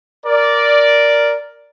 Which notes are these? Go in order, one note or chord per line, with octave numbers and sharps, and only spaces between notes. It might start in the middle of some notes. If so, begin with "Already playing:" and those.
A#4 D5